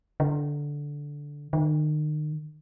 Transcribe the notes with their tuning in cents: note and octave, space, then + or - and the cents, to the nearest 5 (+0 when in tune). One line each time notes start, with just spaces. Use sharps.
D3 -10
D#3 -40